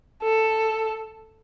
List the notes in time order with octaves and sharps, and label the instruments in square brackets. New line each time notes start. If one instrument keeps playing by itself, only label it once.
[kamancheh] A4